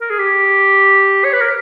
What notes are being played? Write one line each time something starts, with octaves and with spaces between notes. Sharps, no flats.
A#4
G#4
G4
C#5
B4
A#4